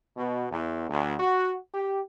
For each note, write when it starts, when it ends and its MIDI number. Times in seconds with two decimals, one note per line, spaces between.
0.17 0.45 47
0.51 0.87 40
0.89 1.15 38
1.20 1.55 66
1.74 1.99 67